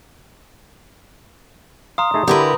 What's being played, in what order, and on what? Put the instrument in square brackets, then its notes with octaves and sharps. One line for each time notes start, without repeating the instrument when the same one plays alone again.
[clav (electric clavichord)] F5 [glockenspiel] A#5 C6 D#6
[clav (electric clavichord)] A3 D#4 G#4
[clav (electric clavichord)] D3 E4 [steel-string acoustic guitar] G4 A#4 B4